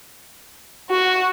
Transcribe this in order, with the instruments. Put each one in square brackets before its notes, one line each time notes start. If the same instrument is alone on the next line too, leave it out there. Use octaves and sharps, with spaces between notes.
[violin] F#4